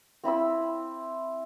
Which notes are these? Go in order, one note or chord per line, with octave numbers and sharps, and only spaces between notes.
C4 E4 B5 E6